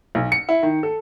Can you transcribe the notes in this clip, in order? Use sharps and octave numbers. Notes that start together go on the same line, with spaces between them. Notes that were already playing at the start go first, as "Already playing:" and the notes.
B1
C#7
E4
D#3
A4